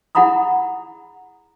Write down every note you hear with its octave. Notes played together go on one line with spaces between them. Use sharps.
E4 G#4 F#5 A#5 B5 D#6